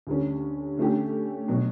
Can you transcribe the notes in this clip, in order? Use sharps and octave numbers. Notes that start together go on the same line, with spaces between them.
D2 D3 G3 C#4
D3 A3 C#4 G4
B2 F#3